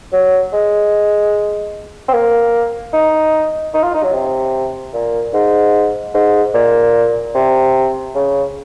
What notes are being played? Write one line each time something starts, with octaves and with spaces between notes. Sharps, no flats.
F#3
G#3
C4
A#3
D#4
D#4
F4
D#4
F#3
C3
A#2
G#2
G#2
A#2
C3
C#3